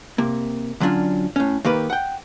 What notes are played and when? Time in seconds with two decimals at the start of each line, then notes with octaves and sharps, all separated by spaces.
0.18 C3 A#3
0.80 D3 F#3 C#4 D4 F4
1.36 A2 C#4
1.65 D#3 A#3 G4 B4
1.90 F#5 G5